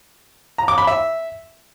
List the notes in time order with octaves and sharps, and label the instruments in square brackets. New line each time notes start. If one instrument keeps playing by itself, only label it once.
[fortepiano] A#5
D6
B5
E5